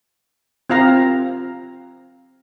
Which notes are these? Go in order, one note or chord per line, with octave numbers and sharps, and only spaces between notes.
C4 F4 F5 A#5